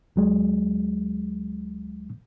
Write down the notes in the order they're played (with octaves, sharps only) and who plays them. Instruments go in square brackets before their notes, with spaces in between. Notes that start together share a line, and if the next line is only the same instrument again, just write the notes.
[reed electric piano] D2 F#3 G#3